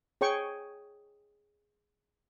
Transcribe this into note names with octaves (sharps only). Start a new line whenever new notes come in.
G#4 C#5 G5 C#6